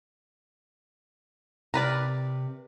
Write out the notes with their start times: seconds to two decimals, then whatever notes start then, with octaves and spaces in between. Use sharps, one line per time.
1.74 C3 A#4 B4 D5